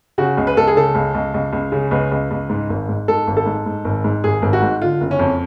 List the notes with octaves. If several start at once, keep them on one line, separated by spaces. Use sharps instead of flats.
C#3 F#4
C#2
B4
C#2 A4
G#4
C#3 A4
C#2
C#2
C#2
C#2
C#3
C#2 B4
C#2
C#2
G#2
G#1
G#2
G#2 A4
G#1
A4
G#2
G#2
G#1
G#2
G#1 G#4
G#1
F#4
G#2
D3 F4
F#1
C#4
F2